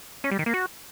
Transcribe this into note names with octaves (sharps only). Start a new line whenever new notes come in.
C#4
G3
D#3
A#3
F#4